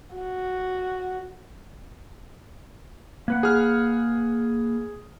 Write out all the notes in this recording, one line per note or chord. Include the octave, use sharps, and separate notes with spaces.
F#4
A#3 B4 F#5
G#4 F6